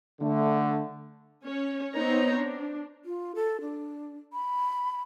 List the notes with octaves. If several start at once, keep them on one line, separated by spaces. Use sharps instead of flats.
D3 A3
C#4 C#5
B3 C4 D#4 C5 C#5 A#5
D4
F4
A4
D4
B5